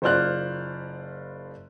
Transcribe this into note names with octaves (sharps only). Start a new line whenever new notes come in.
F#1 F4 C5 D5 F6 F#6